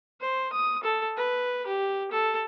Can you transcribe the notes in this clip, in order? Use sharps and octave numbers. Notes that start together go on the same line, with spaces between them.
C5
D#6
A4
B4
G4
A4